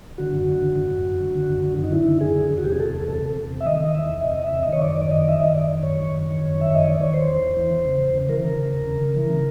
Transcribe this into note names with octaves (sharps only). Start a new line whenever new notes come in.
D3 F#4
F#2
D3
D3
F#2
F#2
F#2
D3
D3
F#2
D3
F#2
D#4
D3 E4
D3
F#2 G#4
D3
E2
F#4
C3 G4
G#4
E2 A4
E2
C3 A4
C3
E2
C3
E5
D#3 D#5
D#3
E2 E5
E2
C3 D#5
E2 E5
C3
D#5
D#3 C#5
F#2 D5
D#3 D5
F#2 D#5
D#3 E5
D#3 D#5
F#2 D5
D#3
F#2 C#5
D#3
F#2
D#3
F#2
D#3
E5
F#2 D#5
D#3 D5
D#3 C#5
E2 C5
E2
E2
E3
E2
C#3
E2
C#3
E3 A#4
C#3
C#3
E2
C#3
C#3
E3
C#3